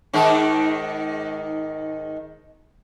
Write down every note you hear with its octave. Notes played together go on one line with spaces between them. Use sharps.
G#2 D#3 D#4